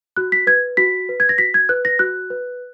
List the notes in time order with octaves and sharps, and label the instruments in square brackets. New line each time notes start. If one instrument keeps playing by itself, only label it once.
[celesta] F#4 F#6
B6
B4 G#6
F#4 B6
B4
G#6
A#6
F#4 B6
G#6
B4 F#6
A#6
F#4 F#6
B4